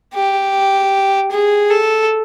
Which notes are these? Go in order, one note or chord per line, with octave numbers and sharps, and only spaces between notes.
G4
G#4
A4